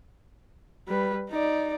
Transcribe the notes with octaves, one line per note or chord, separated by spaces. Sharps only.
G3 B4
D#4 D5